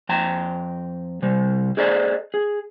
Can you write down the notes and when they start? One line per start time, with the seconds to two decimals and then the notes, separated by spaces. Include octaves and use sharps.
0.09 F2 G5 A#5
1.22 C3 G3
1.77 G#4 A4 C5 D5 D#5 A#5
2.34 G#4